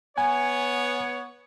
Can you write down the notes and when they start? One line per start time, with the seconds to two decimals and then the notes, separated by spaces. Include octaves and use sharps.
0.18 B3 C#5 G#5